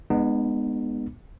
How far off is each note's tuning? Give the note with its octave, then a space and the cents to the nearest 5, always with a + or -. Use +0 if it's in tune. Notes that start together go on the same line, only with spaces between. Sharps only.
G#3 +0 B3 +0 D#4 -40